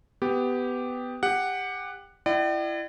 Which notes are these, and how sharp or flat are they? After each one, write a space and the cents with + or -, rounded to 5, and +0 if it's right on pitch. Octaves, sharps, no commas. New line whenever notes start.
B3 +15 G4 +0
G4 +20 F#5 +0
E4 +25 D5 +40 G5 -45